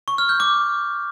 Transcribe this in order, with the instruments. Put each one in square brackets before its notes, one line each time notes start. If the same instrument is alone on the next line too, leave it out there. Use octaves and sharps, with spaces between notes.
[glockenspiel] C#6
F6
G6
D6